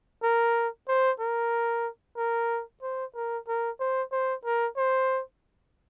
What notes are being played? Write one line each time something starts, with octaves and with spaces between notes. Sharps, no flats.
A#4
C5
A#4
A#4
C5
A#4
A#4
C5
C5
A#4
C5